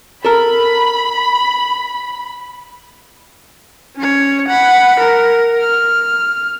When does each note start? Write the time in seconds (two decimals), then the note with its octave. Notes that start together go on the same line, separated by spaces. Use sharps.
0.25 A4 A#4 B5
3.96 C#4 C#5
4.48 F#5 B5
5.00 A#4
5.61 F6